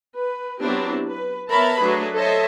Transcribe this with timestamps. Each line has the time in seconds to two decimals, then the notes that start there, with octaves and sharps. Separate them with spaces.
0.15 B4
0.62 F#3 B3 C4 D4 E4 G4
1.06 B4
1.50 B3 A#4 C#5 E5 A5 B5
1.80 F#3 A3 D4 G#4 B4
2.15 A4 C5 C#5 D#5 E5 A5